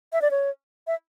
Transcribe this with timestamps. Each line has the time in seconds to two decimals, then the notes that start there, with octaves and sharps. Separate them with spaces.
0.13 E5
0.22 D5
0.31 C#5
0.87 E5